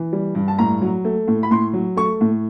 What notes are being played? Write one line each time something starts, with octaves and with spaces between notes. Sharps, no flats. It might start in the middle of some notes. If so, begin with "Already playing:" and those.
Already playing: E3
G3
G2
A5
A2 A#5
F#3
A3
A2
B5
A2 C6
F#3
A3 C#6
A2